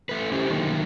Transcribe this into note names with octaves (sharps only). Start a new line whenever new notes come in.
A3 B4
C#4 E4 G4 C5
D3 D#3 F#3 A3 A#3 D#4